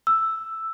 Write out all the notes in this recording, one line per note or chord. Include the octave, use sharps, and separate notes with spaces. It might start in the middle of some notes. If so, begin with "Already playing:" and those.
E6